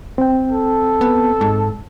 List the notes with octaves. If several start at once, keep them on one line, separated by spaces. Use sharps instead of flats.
C4 G5
A4
B3
G#2